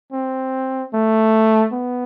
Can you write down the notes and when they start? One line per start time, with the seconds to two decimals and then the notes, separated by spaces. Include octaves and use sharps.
0.12 C4
0.94 A3
1.73 B3